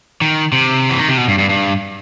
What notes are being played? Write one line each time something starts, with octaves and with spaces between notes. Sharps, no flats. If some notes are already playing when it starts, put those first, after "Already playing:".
D#3
C3
E3
D#3
C3
B2
G2
G2
G2